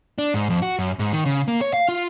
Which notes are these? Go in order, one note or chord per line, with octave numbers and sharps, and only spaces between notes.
D4
G#2
F2
F#4
F#2
G#2
D#3
C#3
A#3
C#5
F5
F4